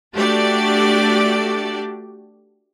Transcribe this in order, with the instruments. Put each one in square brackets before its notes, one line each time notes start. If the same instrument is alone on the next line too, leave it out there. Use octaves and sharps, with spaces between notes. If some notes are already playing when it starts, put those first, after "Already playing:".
[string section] A3 D4 F#4 G4 A4 D5